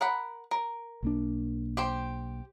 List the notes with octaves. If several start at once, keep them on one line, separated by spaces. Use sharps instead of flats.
A#4 F#5 B5
A#4
B1 A#3 D4
G4 C5 G5